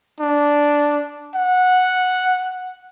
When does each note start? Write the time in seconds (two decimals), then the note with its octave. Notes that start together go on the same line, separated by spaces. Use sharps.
0.20 D4
1.35 F#5